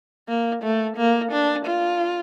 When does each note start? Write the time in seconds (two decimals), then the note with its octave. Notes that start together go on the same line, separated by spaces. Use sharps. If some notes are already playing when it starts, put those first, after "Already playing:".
0.28 A#3
0.63 A3
0.97 A#3
1.32 D4
1.66 F4